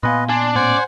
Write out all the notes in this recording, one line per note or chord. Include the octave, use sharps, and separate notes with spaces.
A#2 B3 B4 D#5 F5 G#5 C6
D4 G#5 C6
A2 C#4 C5 D5 F#5 G#5